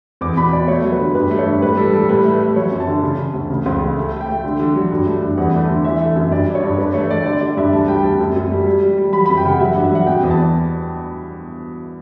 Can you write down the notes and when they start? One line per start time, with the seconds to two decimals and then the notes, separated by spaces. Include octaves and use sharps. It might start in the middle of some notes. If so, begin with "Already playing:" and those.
0.21 E2 D6
0.37 B2 B5
0.53 B2 D5
0.68 A3 C#5
0.84 F#3
0.92 B4
0.99 D3
1.14 G2 B4
1.31 A3
1.38 C#5
1.46 G2
1.61 A2 B4
1.77 G3 A4
1.93 G3 A4
2.09 A2 B4
2.24 A3
2.40 A3
2.56 F#3 C#5
2.71 F#2
2.80 A5
2.87 D3
3.03 C#3
3.18 C#3
3.34 D2
3.50 C#3
3.66 C#2
3.81 C#3
3.97 A3
4.13 A3
4.21 G5
4.29 A3
4.44 D3
4.60 D3
4.75 F#3
4.91 G2
5.06 A3
5.22 G2
5.37 E2 F#5
5.54 A3
5.70 D3
5.84 E3 E5
6.01 A3
6.16 F#2
6.31 G2 D5
6.48 G2
6.55 C#5
6.63 G2
6.78 G2 B4
6.94 A3 C#5
7.10 A3 D5
7.26 D3 D5
7.41 D3 D5
7.57 G2 E5
7.73 D2 A5
7.88 G3 G5
8.04 D2 A5
8.20 F#2
8.36 F#2
8.51 G3
8.66 G3
8.83 G3
8.98 G3
9.13 F#3 B5
9.26 B5
9.29 F#2
9.37 G5
9.45 C#3 F#5
9.60 F#3 E5
9.72 F#5
9.75 G2
9.84 E5
9.91 F#3 F#5
10.07 B2 G5
10.23 E2
10.31 A5